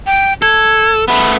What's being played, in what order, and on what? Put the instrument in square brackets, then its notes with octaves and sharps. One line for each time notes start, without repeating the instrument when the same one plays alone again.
[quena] G5
[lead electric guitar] A4 [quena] G#6
[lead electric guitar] A3 B3 [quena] B5